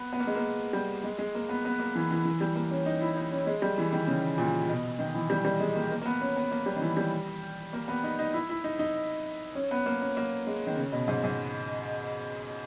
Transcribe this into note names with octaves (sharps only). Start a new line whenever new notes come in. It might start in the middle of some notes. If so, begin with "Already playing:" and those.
Already playing: B3
B3
A#3
G#3
A#3
G3
G#3
G#3
A#3
B3
B3
A#3
E3
E3
E3
G3
A#3
C#4
D#4
E4
D#4
C#4
G#3
G3
E3
D#3
C#3
A#2
B2
D#3
E3
G3
G3
G#3
A#3
A#3
A#3
B3
C#4
B3
A#3
G3
D#3
E3
G3
A#3
B3
D#4
D#4
E4
E4
D#4
D#4
C#4
B3
A#3
C#4
A#3
G#3
D#3
C#3
B2
G#2
G#2